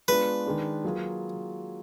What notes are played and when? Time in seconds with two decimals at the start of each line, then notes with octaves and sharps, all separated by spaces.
0.08 G#3 B3 D4 F4 B4
0.46 D#3 G#3 D4
0.84 F#3 A#3 F4 G#4